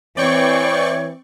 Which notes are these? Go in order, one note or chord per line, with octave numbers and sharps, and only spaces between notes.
E3 C4 C#5 D5 G5 C#6